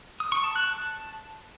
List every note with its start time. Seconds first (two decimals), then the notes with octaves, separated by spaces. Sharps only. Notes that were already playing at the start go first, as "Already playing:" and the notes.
0.20 D#6
0.32 C#6
0.44 A5
0.56 F#6
0.67 A5